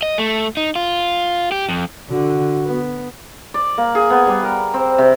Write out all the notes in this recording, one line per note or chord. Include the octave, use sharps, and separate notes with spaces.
D#5
A3
D#4
F4
G4
F2
D3 F#4
B3
D5
A#3
G#4
B3
G3
A#4
C4
C3